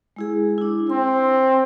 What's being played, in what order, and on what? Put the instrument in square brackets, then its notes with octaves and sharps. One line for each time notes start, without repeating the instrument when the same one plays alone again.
[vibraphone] G#3 E4 G#4
D4 E4
[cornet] C4 [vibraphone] C6